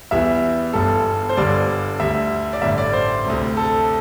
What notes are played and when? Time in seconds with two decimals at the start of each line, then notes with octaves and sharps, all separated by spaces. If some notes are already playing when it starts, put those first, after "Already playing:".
0.11 E2 E3 G3 E5
0.73 G1 G2 G3 A4
1.29 C5
1.37 G1 G2 D3 G3 D5
1.99 D2 D3 G3 E5
2.53 D5
2.62 A1 G2 D3 G3 E5
2.78 D5
2.93 C5
3.26 D2 C3 G3
3.57 A4